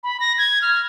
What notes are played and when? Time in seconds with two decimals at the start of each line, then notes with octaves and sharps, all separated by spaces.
0.04 B5
0.20 A#6
0.38 G#6
0.62 F6